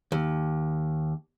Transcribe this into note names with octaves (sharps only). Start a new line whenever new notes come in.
D#2